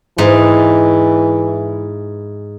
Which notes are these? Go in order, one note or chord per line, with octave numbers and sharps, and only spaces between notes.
G#2 E3